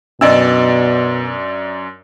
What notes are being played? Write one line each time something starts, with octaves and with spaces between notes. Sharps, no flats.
F#2 B2 D4 D5 D#5 E6